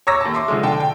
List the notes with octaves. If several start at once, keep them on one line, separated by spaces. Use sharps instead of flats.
C#5 A#5 D6 E6 A#6
D#2 A5
E5 C6 D6
D3 F3 G#3
D3 G5 A5
G5